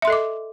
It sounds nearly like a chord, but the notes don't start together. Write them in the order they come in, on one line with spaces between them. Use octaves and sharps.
E5 C6 A4 D#5 D6